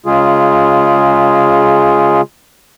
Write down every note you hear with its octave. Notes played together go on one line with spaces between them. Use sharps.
C#3 G#3 F4 G#4